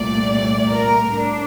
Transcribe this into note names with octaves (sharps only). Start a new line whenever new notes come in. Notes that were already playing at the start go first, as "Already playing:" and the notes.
Already playing: C2 A#2 A3 D5
A#4
A2 D4